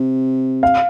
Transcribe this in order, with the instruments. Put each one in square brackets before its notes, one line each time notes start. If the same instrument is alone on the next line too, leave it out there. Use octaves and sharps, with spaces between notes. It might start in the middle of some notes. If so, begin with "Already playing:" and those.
Already playing: [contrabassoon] C3
[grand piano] F5